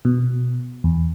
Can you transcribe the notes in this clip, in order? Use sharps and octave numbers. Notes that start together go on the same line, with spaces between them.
B2
E2